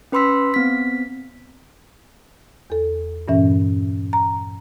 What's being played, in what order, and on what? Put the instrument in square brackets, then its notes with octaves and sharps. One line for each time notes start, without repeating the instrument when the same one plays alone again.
[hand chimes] C#4 B4 B5 C6 E6 B6
B3 C4 B6
[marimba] E2 A4
G2 A#2 E3 C#4 E5
A#5